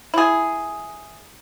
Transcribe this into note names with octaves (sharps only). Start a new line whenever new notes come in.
E4 G#4